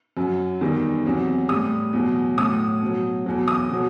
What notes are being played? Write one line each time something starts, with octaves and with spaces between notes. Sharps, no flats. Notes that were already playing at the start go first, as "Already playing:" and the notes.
F#2 F#3
E2 D#3 G3
E2 C3 F#3
A2 G3 D#6
E2 B2 F#3
A2 F#3 D#6
B2 F#3
E2 B2 F#3
D#6
B2 F#3